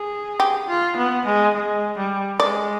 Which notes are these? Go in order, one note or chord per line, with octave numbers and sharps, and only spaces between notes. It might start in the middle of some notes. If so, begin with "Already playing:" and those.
Already playing: G#4
G4
F4
B3
G#3
G#3
G3
G#3 D5